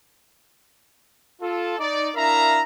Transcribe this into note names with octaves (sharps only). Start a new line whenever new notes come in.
F4 A4
D#4 D5
D4 E4 A#4 E5 F5 A#5